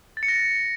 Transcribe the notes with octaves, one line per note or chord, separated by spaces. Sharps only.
A6
C#7
A#6